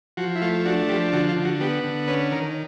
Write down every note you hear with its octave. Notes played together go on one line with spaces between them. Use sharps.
F3 F#4
E4
A3 F4
D4 F#4
F3 G4
D3 F#4
F4
D3
F#4
B3 G4
D3
C#4 B4
D#3 A#4